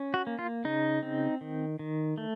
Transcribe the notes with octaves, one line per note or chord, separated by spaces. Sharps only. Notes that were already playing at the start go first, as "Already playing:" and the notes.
Already playing: C#4
F#4
A#3
F4
C#3 D#4
C4
D#3
D#3
A3